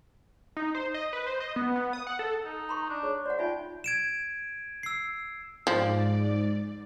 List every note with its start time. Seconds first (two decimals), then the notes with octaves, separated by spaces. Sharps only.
0.57 D#4
0.75 C5
0.94 D#5
1.13 B4
1.26 C5
1.40 D#5
1.56 B3
1.76 B3
1.93 D#6
2.07 F#5
2.19 A4
2.45 D#4
2.69 A#5 C6 C#6
2.90 D4
3.03 G#4 C#5 C#6
3.26 C5 D5 F#5
3.39 D#4 F4 E5 G5
3.84 G#6 D7 E7
4.83 E6 C7
5.67 G#2 F3 D5